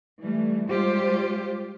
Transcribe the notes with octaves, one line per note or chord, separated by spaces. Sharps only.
E3 G3 A3
G3 G#3 F4 G4 C5